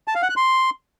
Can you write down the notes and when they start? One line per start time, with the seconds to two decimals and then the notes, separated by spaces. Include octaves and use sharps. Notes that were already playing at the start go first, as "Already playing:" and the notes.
0.08 A5
0.15 F5
0.22 F#5
0.29 F#6
0.37 C6